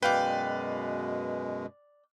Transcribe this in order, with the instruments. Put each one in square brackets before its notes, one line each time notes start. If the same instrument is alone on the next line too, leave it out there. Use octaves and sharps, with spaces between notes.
[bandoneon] F#2 B2 G#3 [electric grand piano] B4 F5 [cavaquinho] D5 G5